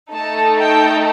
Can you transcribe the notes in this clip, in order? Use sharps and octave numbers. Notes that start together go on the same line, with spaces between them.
A3 D#4 A4 A5
G5